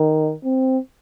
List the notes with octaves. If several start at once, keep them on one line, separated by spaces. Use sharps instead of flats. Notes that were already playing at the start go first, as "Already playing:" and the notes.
Already playing: D#3
C4